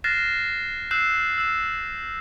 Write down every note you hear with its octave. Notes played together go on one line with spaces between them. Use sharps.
F6 F#6 A6 A#6 C7 E7
E6 F#6 G6 C7 E7
E6 E7